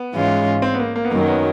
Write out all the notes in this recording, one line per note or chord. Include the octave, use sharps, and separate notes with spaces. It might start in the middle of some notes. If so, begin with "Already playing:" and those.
Already playing: B3
G#2 E3 G#3 C#4 F4
C4
B3
A#3
A#3
B3
F#2 D#3 F#3 A#3
B3